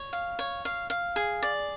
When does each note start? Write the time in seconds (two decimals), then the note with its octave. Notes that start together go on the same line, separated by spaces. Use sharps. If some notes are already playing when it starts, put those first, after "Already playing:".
Already playing: C#5
0.13 F5
0.39 C#5
0.65 F5
0.90 F5
1.16 G#4
1.43 D5